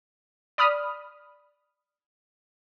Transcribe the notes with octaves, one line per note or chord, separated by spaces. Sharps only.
D5 B5 D#6 F6